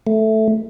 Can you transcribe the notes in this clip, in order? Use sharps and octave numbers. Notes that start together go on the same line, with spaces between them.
A3